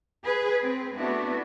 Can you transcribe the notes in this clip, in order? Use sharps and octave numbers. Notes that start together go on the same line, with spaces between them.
G#4 B4
C4
A3 B3 D4 E4 F#4